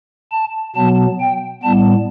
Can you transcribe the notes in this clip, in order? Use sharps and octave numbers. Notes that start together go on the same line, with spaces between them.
A5
B2 F#3 B3 A5
G5
A2 G3 B3 A5